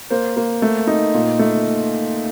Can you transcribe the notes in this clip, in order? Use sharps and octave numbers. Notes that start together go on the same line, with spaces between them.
A#3 C5
A#3
A3
D#4
A#2
A3